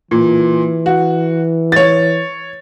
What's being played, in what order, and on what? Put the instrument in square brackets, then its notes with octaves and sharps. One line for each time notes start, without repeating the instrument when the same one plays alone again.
[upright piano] A#2 [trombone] E3
[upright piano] F#4
C#5 A6